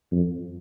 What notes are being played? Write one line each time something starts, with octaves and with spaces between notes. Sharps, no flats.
F2